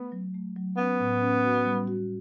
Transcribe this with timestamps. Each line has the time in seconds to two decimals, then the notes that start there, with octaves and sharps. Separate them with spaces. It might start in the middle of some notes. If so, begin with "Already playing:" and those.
Already playing: A3 B3
0.12 F#3
0.34 A3
0.56 F#3
0.77 B3 C#4
1.00 A2
1.22 C#4
1.44 F#4
1.65 G3
1.88 F#4